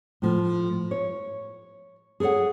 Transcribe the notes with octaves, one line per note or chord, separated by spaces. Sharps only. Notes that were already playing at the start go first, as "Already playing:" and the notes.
A2 F3
C#5
G#4 A4 B4 C#5 F#5